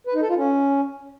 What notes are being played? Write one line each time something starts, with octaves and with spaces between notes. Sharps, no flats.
B4
D#4
A4
F4
C#4